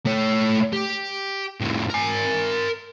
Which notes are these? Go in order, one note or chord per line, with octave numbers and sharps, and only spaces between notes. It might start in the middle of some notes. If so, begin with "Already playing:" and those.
A3 C#5
G4
F2 A2
A#4 G#5